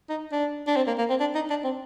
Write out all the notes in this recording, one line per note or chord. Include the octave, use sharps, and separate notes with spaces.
D#4
D4
D4
C4
A#3
A#3
C4
D4
D#4
D4
C4